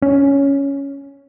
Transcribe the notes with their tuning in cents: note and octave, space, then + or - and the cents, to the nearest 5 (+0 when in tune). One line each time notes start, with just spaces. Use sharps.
C#4 +5